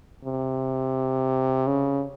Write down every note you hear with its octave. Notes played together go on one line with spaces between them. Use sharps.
C3
C#3